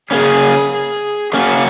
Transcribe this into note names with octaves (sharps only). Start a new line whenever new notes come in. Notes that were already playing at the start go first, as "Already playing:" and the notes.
C#3 A#3 C#4 G#4
G#4
C#3 F#3 A#3 C#4 F#4